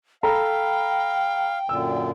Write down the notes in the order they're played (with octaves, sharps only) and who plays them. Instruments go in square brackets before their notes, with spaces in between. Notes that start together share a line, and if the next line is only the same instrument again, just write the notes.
[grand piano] A4 A#5 B5 [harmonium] F5 [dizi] G5
[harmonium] F#2 A#2 D3 [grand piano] E6